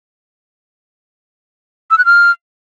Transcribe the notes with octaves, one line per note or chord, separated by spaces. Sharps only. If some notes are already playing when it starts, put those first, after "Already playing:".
E6
F#6
F6